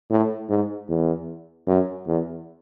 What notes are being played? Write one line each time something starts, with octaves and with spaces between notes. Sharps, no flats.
A2
G#2
E2
F#2
E2